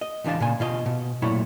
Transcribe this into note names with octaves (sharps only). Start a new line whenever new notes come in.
D#5
C#2 E3 D4 F5 A5
A#2 C#3 G#5
B2 F4 D#5
B2
F#2 A#2 A3 E4 C#5